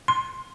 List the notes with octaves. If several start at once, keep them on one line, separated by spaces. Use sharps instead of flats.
C6